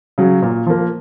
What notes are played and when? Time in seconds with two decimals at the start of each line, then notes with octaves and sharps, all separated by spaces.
0.18 C#3 F#3
0.42 A#2
0.66 F3 A#3